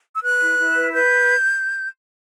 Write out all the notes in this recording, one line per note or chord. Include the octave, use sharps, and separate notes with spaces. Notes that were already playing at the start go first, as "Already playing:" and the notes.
E6
B4 F#6
E4
E4
B4
B4 G6